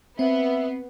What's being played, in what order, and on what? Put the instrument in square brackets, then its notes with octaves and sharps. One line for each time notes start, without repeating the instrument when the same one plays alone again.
[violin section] B3 [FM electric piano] C4 [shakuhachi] E5